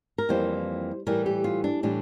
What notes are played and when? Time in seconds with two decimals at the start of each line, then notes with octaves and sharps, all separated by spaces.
0.18 A#4
0.29 F2 E3 G3 A#3 C5
1.07 A2 E3 G3 A#4
1.26 G4
1.44 F4
1.64 D4
1.83 A2 E3 G3 D4